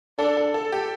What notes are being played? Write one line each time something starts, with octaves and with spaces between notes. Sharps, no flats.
D4 A4
A4
A4
G4